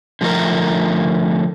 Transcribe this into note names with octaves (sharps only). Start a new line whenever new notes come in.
D3 F3 A3 D#4 A#4